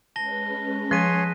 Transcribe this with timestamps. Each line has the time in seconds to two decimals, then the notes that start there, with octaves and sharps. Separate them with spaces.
0.16 G#3 C#4 B4 A5 A#6 G7
0.91 F3 G#4 C#5 C6 F#6 B6 D#7